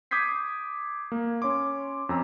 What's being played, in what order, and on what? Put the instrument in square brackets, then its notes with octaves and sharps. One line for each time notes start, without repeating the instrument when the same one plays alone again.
[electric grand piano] D6 D#6 G6 G#6 B6 C7
A#3
C#4 C#5 C6 D6
F2 C#4 A#5 E6